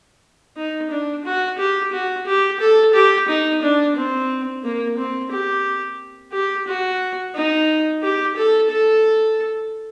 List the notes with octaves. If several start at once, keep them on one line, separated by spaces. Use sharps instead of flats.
D#4
D4
F#4
G4
F#4
G4
A4
G4
D#4
D4
C4
A#3
C4
G4
G4
F#4
D#4
G4
A4
A4